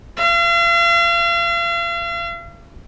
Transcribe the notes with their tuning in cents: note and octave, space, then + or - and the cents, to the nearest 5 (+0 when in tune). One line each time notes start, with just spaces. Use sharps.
F5 -40